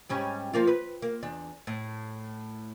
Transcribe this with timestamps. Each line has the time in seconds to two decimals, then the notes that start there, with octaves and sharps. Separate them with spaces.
0.09 G#2 G3 C#4
0.54 F3 A#3 F4
0.67 B4
1.02 A#3
1.23 E2 D4
1.67 A2